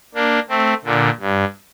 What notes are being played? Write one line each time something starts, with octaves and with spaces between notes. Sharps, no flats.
A#3 D4
A3 C4
A#2 D3
G2